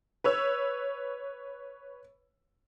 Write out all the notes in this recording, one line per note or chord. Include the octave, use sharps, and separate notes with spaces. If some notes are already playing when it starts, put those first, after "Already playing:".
B4 C#5 E6